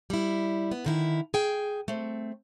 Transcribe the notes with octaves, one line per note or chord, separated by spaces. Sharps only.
G3 E4
B3
D3 D#3 E4
G#4 G5
A3 C4